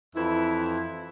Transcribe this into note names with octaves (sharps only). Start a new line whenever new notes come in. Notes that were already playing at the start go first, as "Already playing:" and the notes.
F2 E3 E4